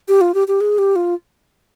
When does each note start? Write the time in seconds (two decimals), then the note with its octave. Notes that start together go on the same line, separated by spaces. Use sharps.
0.08 G4
0.21 F4
0.34 G4
0.48 G4
0.61 G#4
0.78 G4
0.96 F4